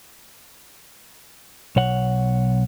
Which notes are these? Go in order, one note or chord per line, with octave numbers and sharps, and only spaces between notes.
B1 C#5 F#5